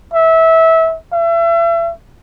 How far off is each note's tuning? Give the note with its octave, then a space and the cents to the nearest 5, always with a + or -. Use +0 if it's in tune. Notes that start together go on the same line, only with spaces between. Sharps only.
E5 -20
E5 +35